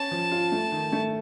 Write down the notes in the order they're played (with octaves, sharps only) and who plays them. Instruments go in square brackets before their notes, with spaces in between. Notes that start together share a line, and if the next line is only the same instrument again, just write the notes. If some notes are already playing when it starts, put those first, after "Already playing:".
Already playing: [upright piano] C#4 [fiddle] A5
[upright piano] F3
F4
A3
D#3
A3